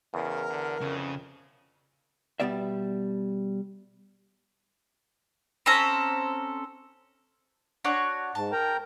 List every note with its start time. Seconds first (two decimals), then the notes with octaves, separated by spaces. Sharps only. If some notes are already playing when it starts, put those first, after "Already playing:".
0.14 E2 C#3 A#4
0.50 D3
0.81 F2 C#3
2.40 B2 D#3 G3 B3 D5 E5
5.66 C4 C#4 A4 A#5
7.85 D4 F#4 C#5
8.35 G#2 A5
8.52 A#4 G5 A#5